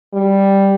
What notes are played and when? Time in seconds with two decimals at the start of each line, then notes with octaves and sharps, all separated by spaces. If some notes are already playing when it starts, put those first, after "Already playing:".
0.14 G3